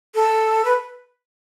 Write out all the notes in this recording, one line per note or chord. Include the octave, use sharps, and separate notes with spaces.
A4
B4